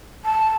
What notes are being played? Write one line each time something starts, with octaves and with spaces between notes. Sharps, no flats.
A5